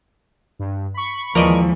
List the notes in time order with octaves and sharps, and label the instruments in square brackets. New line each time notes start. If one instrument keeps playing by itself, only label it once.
[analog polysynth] G2
B5 C#6
[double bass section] D#2 E3 G#3 [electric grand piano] F3 [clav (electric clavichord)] A#4 D5 D#5